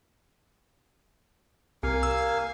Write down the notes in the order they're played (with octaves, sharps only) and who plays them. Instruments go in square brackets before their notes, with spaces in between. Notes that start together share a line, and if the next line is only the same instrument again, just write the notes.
[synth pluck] C2 [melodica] A#3 F5 G#5
[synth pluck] E6